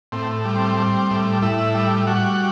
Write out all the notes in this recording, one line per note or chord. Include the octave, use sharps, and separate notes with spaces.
A2 C4
G3
C4
G3
A2
A2 E4
G3
G3 F#4